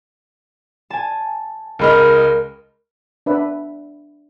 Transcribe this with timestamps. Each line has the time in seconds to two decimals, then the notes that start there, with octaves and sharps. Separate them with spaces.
0.90 G#5 A5
1.79 C#2 G#3 A#4 D#5 B5 F6
3.26 D4 B4 E5